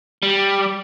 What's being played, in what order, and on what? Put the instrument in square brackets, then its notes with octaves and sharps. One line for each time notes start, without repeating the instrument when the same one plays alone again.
[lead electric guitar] G3